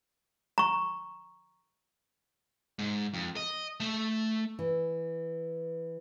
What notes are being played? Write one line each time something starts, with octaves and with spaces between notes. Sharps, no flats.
A#5 C#6
G#2
F2
D#5
A3 A5
E3